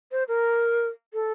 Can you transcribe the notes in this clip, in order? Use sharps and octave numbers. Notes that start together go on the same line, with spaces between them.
C5
A#4
A4